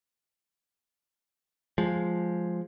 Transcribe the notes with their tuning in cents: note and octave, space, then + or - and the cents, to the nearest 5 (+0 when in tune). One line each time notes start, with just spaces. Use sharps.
F3 +0 G#3 +0